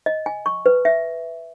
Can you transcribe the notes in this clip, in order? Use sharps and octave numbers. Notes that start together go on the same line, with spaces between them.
D#5
G#5
C#6
B4
E5